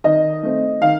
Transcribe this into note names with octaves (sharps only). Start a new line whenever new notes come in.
D#3 D#5
A3 C4
D#3 F5